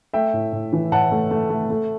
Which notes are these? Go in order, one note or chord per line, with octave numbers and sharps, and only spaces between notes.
A3 E5 G5
A2
A2
E3
A2 F#5 A5
A3
A3
A3
A3